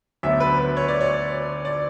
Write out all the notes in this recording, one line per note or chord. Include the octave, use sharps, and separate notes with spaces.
D2 D3 F#3 B3 E5
B4
B4
C#5
D5
C#5
D5